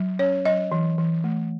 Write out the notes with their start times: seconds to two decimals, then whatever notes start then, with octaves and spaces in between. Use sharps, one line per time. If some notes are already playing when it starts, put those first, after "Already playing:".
Already playing: F#3
0.19 C#4 C#5
0.45 F#3 D#5
0.72 E3
0.98 E3
1.24 A3